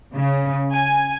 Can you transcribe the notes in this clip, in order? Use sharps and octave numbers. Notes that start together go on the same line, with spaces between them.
C#3
G#5